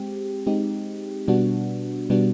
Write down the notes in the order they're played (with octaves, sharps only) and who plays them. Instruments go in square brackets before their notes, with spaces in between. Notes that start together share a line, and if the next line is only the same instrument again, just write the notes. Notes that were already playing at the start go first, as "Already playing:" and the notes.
Already playing: [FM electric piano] G#3 C4 G4
G#3 C4 D#4 G4
B2 G3 B3 D4 F#4
B2 G3 B3 D4 F#4